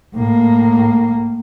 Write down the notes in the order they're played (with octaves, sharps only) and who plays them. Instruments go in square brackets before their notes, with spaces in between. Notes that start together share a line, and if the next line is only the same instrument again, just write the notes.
[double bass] A2 A#3